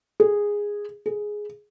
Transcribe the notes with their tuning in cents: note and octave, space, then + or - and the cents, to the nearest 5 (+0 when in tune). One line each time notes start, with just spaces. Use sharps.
G#4 -10
G#4 +5